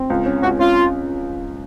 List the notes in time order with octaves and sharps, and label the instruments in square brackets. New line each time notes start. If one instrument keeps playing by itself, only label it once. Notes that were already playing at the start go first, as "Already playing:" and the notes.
Already playing: [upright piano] C4
C#2
C#4
[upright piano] C#2 [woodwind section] F#4
[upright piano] C#4 [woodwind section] F4